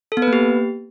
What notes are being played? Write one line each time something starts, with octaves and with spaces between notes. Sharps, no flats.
A4
B3
B4
A#3
G4